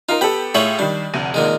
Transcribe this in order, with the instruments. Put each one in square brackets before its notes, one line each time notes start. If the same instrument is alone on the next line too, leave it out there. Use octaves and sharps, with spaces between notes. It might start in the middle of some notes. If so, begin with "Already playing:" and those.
[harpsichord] D#4 [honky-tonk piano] F4 A#4
[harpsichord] B3 B5 [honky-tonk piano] G4 A4
[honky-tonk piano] A2 C#5 F#7 [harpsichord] F4 G#4 E5
[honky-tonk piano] D#3 G3 [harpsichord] D4
[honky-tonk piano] F1 D2 D#7
[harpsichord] A#2 D#3 G#3